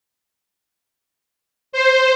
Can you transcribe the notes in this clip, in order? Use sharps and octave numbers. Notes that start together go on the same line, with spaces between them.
C5